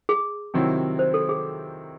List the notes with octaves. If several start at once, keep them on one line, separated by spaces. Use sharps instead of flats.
G#4
C3 D#3 F#3 C4 E4
C5
A4
G#4